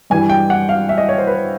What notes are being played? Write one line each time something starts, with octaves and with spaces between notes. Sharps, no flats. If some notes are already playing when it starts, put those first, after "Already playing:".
G2 E3 G3 G#5
G5
F#5
F5
E5
D#5
C#5
C5
B4